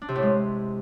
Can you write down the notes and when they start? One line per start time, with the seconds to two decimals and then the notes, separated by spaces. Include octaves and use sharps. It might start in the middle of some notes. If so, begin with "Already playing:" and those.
0.02 D4
0.09 C3
0.15 A2
0.22 G#3